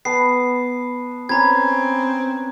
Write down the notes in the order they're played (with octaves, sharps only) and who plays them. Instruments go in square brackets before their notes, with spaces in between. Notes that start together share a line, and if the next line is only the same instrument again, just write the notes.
[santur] B3 A5 [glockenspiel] C7
[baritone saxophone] C4 [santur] C#4 B4 [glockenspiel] A#5 G#6